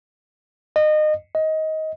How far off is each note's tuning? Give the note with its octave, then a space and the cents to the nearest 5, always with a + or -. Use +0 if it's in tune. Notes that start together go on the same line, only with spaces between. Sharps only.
D#5 -25
D#5 +20